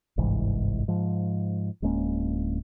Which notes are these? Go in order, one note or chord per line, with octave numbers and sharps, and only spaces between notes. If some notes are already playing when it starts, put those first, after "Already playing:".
G1 C2 G#2 E3
G#2 F3
D1 G#3 A#3 C#4